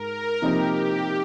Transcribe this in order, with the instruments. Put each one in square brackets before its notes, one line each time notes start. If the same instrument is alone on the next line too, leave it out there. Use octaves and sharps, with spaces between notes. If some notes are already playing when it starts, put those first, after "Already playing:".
Already playing: [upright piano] G#2 G#3 [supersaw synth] A#4
[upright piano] C3 F3 A#3 D#4 [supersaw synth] G4